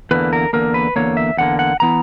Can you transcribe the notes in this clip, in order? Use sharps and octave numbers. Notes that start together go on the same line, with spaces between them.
E2 D3 A#3 B4
A#4
E2 D3 A#3 A#4
B4
E2 D3 A#3 C#5
E5
E2 D3 A#3 F#5
F#5
E3 B3 E4 A#5